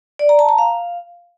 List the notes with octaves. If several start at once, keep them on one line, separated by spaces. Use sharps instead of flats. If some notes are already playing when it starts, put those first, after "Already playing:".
D5
A#5
A5
A#5
F5